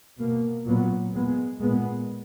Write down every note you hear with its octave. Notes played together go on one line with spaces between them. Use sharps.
B2 A#3
A#2 F#3 B3
A#2 G#3 B3
A#2 G#3 B3